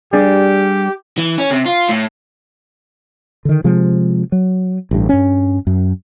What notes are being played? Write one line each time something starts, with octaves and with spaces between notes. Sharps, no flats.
G3 D4 G4 G#4
E3
C#4
C3
F4
A2
D3 D#3
C3 F3 G#3
F#3
A1 G2
G2 C#4
F#2